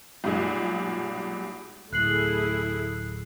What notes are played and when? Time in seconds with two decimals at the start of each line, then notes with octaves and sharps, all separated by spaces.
0.24 B1 G2 A#2 G#3
1.93 D1 A3 E4 G#4 F#6 C7 F#7